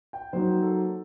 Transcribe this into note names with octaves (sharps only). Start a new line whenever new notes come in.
G5
F#3 A#3 D#4 C5
A4